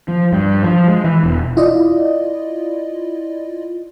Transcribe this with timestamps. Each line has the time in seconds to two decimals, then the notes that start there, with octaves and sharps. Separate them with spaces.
0.08 F3
0.33 G2
0.64 F3
0.89 G#3
1.04 E3
1.24 E1
1.57 E4 F4 D5 D#5